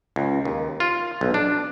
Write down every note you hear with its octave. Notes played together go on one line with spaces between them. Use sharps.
C#2
D#2
F4
B1
D4